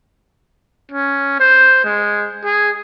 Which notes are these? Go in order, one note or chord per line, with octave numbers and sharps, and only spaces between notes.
C#4
C5
G#3
G#4